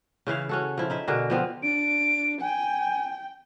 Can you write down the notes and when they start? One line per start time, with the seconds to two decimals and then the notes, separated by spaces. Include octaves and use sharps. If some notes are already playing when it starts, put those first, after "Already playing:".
0.27 C#3 E3 E4 F5
0.49 C#4 F#4 A4
0.78 F3 E4
0.90 D#4 E4 E5
1.08 B2 D3 G#4 A#4
1.30 F3 B3 C4
1.63 D4 D7
2.41 G5 G#5